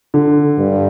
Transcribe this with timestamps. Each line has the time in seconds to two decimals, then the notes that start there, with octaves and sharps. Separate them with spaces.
0.14 D3
0.58 G2